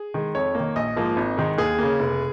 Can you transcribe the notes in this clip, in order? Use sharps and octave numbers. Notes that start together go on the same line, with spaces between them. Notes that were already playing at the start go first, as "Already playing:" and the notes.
Already playing: G#4
D#3 G#3
F2 C#5
D#3 A#3
A#1 D#5
G#2 F3 A#3
G#1
G#2 D#3 G#3
D#2 G#4
C#3 A#3
F1